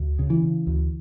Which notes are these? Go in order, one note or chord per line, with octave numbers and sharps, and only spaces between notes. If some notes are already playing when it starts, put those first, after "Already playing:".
Already playing: D2
C#3
E3
C#3
D2